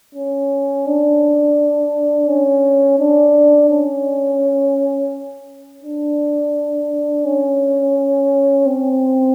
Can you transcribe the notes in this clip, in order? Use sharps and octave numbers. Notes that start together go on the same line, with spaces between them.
C#4
D4
C#4
D4
C#4
D4
C#4
C4